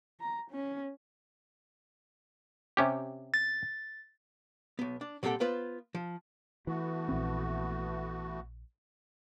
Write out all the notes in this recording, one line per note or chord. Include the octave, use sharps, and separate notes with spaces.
A#5
C#4
C3 C#4 G4
A6
B1 B3
D4
A#2 G3 C4 G4 A4 F#5
B3 F4 B4 C5
F3
E3 A3 B3 F#4
A#1 C4